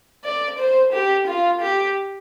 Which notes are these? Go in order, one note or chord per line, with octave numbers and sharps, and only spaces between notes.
D5
C5
G4
F4
G4